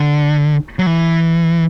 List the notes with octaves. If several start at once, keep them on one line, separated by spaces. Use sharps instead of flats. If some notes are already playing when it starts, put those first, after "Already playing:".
Already playing: D3
F#3
E3